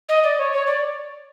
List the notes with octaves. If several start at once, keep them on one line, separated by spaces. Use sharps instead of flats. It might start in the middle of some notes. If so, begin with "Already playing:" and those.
D#5
D5
C#5
C#5
D5